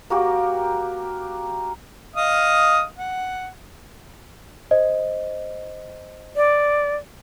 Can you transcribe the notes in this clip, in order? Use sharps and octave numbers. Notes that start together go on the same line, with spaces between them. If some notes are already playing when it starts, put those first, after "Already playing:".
A#3 F#4 G4
D#5 F5 D#6
F#5
C5 D#5
D5